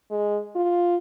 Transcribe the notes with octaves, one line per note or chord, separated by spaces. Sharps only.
G#3
F4